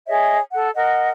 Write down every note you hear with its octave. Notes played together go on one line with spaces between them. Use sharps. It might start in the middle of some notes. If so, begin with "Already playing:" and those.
G#4 C#5 D#5 E5
A4 F#5
A#4 D#5 F#5